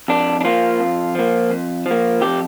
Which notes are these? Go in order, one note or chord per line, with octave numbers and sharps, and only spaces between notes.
F2 D4
D4
F3 A#3 F4
F2
F3 A#3
F2
F3 A#3
F2 G4